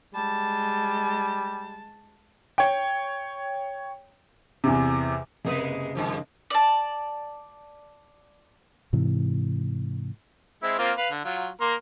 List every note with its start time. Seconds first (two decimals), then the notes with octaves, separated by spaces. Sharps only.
0.14 G3 G#3 A5
2.58 C#5 G5
4.64 E2 C3
5.45 F#1 C3 G#3 A#3 B4 D#6
5.95 G2 D#3 F3
6.50 D5 A5
8.93 G#2 C3 E3
10.63 G#3 C4 E4
10.79 A#3 C4 F4
10.98 B4 F5
11.11 D3
11.25 F#3 F4
11.61 A#3 A#4 C6